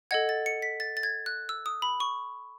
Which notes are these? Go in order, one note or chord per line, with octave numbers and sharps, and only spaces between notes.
A4 D#5 F#5 G#6
A6
C#7
B6
A6
A6
G#6
F#6
E6
D#6
B5
C#6